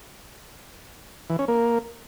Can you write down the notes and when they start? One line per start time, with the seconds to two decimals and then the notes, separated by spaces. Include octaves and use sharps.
1.30 E3
1.39 C#4
1.48 A#3